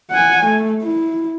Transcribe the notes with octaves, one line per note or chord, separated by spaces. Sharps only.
F#5 G#5
A3
E4